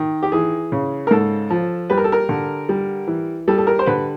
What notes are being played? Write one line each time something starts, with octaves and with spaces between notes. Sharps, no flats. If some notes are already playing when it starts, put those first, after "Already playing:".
Already playing: D#3
G4
E3 G#4
C#3
A#4
G#2 A4
F3
G3 B4
A#4
A4
A#4
D3
G3
E3
G3 A4
A4
A#4
C5
D3 B4